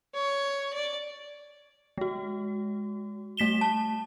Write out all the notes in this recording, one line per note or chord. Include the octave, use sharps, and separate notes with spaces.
C#5
D5
G#3 F#4
G3 A3 B6 E7 G7
A5